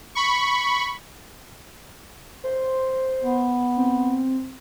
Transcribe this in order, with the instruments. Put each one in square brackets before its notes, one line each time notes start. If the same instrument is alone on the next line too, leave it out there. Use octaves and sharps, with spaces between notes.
[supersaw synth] B5 C#6
[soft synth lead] C5
[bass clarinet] B3
[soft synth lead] C4